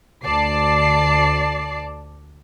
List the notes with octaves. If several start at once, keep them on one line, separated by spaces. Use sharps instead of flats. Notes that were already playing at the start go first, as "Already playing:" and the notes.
D2 D5 A5 C7